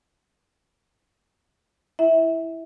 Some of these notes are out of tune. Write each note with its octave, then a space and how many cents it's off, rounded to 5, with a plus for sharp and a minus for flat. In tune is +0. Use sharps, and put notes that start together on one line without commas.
E4 +0 E5 -20